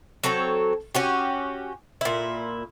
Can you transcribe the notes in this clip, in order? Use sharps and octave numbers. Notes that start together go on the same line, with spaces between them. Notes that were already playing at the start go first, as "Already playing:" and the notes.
F#3 C4 A4 C#5
C#4 F#4 G4
A#2 E4